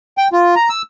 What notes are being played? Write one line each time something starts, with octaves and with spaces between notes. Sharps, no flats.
G5
F4
A#5
E6